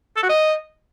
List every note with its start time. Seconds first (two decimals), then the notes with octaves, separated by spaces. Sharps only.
0.16 A4
0.23 F#4
0.29 D#5